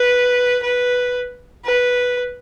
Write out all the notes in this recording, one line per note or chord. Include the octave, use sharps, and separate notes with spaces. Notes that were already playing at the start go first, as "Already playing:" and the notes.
Already playing: B4
B4
B4